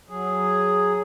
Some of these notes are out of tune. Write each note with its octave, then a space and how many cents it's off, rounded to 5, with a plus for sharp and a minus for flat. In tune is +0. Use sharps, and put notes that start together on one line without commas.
F#3 +0 G#4 +0